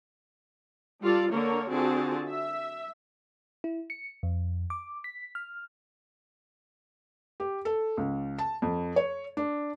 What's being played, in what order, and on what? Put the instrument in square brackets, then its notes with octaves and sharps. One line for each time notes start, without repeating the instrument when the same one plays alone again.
[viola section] G3 F4 A4 D5
D3 A#3 A#4 C#5
D3 C4 F4 F#4 G#4 A5
E5
[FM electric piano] E4
C#7
F2
D6
B6
F6
[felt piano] G4
A4
C#2
A5
F2
C#5
D4